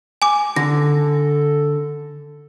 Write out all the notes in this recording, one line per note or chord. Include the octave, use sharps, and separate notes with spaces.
G#5 D6
D3 A4 A#6